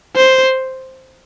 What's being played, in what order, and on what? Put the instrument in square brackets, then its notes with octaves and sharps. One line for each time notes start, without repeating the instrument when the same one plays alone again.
[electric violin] C5